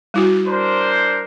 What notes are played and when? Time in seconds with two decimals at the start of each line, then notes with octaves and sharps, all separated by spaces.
0.14 G3 E4 F#4
0.47 D4 A#4 C5